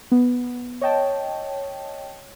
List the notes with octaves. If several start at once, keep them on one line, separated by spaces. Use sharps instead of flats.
B3
C#5 D#5 G5 A5